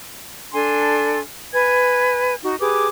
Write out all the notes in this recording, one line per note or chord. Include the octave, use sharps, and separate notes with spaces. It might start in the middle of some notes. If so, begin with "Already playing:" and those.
D4 A4 G#5 C6
B4 G#5 G#6
D#4 F#4
G4 G#4 B4 D6